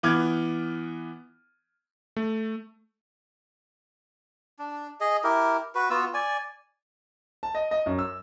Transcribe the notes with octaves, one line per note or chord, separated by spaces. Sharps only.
E3 B3 D6 F6 G#6
A3
D4
G#4 D#5
E4 G4 A#4
F#4 B4
B3 F4 F#4 E6
D5 G#5
A5
D#5
D#5
F#2
E6